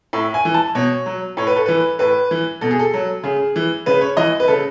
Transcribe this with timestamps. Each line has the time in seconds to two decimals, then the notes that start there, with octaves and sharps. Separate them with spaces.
0.13 A2 E5
0.34 G#5
0.45 E3
0.54 A5
0.75 B2 C#5
1.06 F#3
1.37 A2 C#5
1.47 B4
1.56 A4
1.66 E3 B4
1.99 A2 B4
2.31 E3
2.61 B2 A4
2.71 G#4
2.79 A4
2.94 F#3
3.23 C#3 G#4
3.56 E3
3.86 C#3 B4
4.01 C#5
4.17 E3 D#5
4.40 B4
4.48 C#3 A4